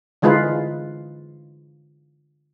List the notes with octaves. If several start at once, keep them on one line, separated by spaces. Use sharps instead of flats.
D3 E3 G#3 D#4 F4 B4